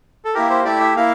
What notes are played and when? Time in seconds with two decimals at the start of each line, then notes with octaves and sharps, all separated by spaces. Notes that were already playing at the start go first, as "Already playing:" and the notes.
0.25 A4
0.35 A#3 E4 G4 A#4
0.50 C5
0.65 A3 E4 G4 D5
0.80 E5
0.96 A#3 E4 F5